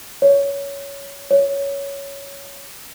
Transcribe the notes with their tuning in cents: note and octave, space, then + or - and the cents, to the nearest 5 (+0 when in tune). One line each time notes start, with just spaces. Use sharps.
C#5 +15
C#5 +10